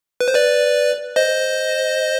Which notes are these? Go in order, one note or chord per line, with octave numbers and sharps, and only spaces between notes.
B4
C5
B4 D5
C5 D#5